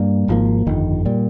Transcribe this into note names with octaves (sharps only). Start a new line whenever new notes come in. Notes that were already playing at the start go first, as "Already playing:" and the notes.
Already playing: G2 G3 A#3
G#1 G#2 F3 A#3
G1 F2 D#3
A#2 G3